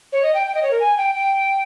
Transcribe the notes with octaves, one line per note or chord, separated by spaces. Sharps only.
C#5
D#5
G5
G5
D#5
C#5
A#4
G#5
G5
G5